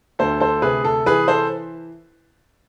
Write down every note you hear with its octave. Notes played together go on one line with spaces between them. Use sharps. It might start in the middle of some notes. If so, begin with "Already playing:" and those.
D2 A4 C5
A4 C5
C3 G#4 B4
A4
E3 G#4 B4
A4 C5